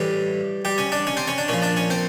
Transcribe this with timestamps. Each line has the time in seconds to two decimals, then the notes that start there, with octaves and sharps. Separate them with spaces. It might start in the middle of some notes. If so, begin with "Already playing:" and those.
Already playing: A2 E3 G3 G4
0.65 G3 G4
0.78 C#4 C#5
0.92 D4 D5
1.07 C#4 C#5
1.17 C4 C5
1.28 C#4 C#5
1.38 D4 D5
1.48 A#2 F3 C#4 C#5
1.62 D4 D5
1.77 C#4 C#5
1.90 C4 C5